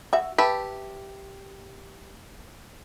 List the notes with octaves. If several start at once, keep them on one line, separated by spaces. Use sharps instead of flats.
F#4 E5
G4 B4 E5 A5